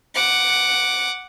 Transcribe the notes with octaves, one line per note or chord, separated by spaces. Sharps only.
F#5 D6